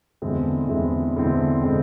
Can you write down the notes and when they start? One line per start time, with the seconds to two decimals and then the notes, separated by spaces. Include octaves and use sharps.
0.22 E2 D3 G#3 C4 E4
0.68 E2 D3 G#3 C4 E4
1.16 E2 D3 G#3 C4 E4
1.62 D3 G#3 C4 E4